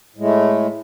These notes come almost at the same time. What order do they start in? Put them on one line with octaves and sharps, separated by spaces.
A2 G#3 A3